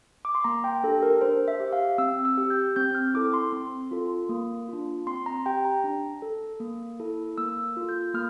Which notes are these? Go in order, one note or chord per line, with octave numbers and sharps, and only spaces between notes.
D6
C6
A#3 A#5
G5
D4 G4 A4
A#4
D4 C5
E5
G4
F5
C4 E6
E6
G4
G6
C4 G6
F6
E4 A4 D6
C6
C4
F4 A4
A#3
D4 F4
C4 C6
A#5
G4 G5
A#5
D4
A4
A#3
E4 A4
A#3 E6
F4 A4
G6
A#3 F6